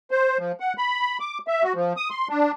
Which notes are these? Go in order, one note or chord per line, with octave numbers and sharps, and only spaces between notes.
C5
F3
F#5
B5
D6
E5
F#4
F3
D#6
C6
D4